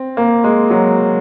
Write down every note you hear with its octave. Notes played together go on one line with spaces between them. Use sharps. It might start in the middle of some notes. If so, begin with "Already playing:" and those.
Already playing: C4
A#3
G#3
F#3